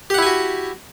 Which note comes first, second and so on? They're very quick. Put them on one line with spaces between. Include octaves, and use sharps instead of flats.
G4 F#5 E4 G#5 F#4